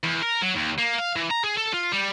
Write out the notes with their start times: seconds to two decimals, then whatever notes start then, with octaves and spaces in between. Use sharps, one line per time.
0.04 E2
0.23 A#4
0.43 F#3
0.56 D#2
0.79 A#3
0.99 F5
1.16 E3
1.31 A#5
1.44 G#4
1.57 A4
1.74 F4
1.92 G3